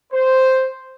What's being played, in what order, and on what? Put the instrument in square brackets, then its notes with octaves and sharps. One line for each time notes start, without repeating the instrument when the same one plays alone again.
[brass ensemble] C5